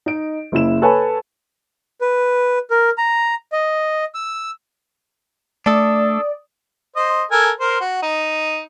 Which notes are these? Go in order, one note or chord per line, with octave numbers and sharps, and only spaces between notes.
D#4 D#5 D7
F#1 C#3 E4 E7
A4 B4 C#5 G#5 A5 B5
B4
A#4
A#5
D#5
E6
A3 D4 A4 D5 D#6
C5 D#5
A4 A#4 G#5
A#4 C5
F#4
D#4